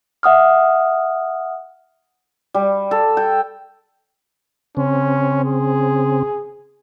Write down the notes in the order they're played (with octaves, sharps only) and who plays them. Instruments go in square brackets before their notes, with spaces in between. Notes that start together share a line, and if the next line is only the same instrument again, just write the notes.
[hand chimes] E5 F#5 D#6 F6
[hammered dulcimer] G3
A4
G5
[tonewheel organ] C#3 C4 [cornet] C#4
[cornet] G#4